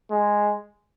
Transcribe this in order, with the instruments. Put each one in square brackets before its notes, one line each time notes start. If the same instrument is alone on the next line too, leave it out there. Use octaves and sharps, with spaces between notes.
[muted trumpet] G#3